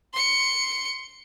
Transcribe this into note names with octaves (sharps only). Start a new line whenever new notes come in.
C6 C#7